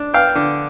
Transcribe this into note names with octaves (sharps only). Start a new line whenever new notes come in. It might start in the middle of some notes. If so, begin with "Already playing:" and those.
Already playing: D4
B3 F5 G5
D3